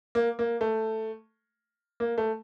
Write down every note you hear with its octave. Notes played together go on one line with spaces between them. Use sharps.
A#3
A#3
A3
A#3
A3